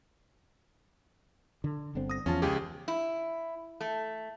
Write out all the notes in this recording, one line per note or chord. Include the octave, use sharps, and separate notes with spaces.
D3
G1 D3 C4
D#6 A#6
E2 F3 C#4 F4 A5
C#2 G4 G#4
E4
A3